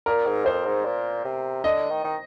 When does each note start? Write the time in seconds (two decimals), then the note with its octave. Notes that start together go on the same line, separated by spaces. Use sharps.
0.06 A#2 A#4
0.26 G#2
0.46 F2 C5
0.66 G#2
0.85 A#2
1.24 C3
1.64 D3 D#5
1.90 D#3
2.04 D#3